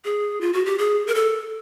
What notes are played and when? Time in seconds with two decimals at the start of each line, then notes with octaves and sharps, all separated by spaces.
0.05 G#4
0.41 F4
0.53 F#4
0.65 G4
0.78 G#4
1.07 A#4
1.15 A4